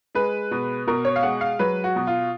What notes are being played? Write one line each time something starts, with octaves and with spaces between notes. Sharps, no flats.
G#3 B4
B2
B2 A#4
C#5
F5
G#3 F#5
F5
F#3 B4
F#4
B2
F4